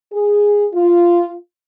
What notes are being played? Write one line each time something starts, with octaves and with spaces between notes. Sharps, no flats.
G#4
F4